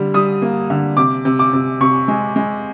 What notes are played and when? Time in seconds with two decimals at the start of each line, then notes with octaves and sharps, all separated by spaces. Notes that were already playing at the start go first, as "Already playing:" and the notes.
Already playing: D3 G3
0.14 G3 D#6
0.42 A#3
0.70 D3
0.97 C3 D6
1.25 C3
1.39 D6
1.53 C3
1.81 C3 C#6
2.08 G#3
2.36 G#3